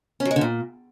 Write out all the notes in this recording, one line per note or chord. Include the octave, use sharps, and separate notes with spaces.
C#4
F#3
G#3
D3
A#2